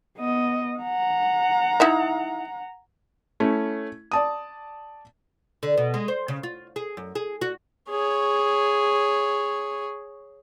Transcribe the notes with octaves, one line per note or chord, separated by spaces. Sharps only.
B3 D#5
F#5 A#5
D#4 E4 E5
A3 C#4 E4
D5 A5 D#6
D3
B2
G#3
C5
C#3
F4
G#4
F#2
G#4
F#4
G#4 C#5